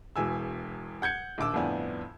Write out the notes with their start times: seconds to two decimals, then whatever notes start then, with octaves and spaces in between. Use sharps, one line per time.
0.16 E1 E2 G#5 E6
1.02 F#5 G6 G#6 C#7
1.38 A#1 D#2 D6 E6
1.53 G1 F2 A2 B3 D4 G#5